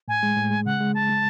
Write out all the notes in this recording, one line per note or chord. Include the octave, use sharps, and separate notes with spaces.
A2 G#5
G#3
A2
G#3
C#3 F#5
G#3
G#3 A5
G#3